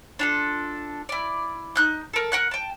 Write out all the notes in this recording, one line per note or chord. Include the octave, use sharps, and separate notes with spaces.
D4 F4 A4
E4 D5
D#4 F#6 G6
A4 A#4
A#4 F#5 F#6
G5 A5